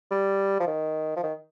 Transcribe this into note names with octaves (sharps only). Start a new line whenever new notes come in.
G3
F3
D#3
F3
D#3